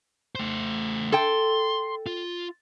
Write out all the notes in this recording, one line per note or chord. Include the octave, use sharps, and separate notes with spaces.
A3 C5
A4 G5 C6
F4